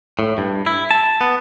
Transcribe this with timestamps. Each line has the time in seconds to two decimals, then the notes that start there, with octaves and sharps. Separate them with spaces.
0.19 A2
0.38 G2
0.66 E4
0.91 A5
1.21 B3